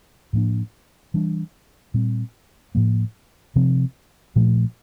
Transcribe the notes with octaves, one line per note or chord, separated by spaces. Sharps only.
A2 F3 A#3 D4
E3 G3 D4
A#2 G3 C4
A2 F3 A#3
C3 F3 C4
A#2 F3 A3